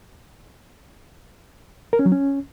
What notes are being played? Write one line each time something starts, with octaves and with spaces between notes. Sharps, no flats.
A#4
C#4
F#3
C#4